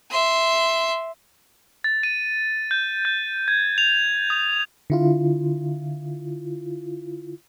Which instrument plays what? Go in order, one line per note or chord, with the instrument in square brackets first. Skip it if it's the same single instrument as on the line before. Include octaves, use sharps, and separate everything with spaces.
[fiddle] E5 C6
[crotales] A6
D#7
G6
G6
G#6
F7
D#6
[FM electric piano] D3 E4 F4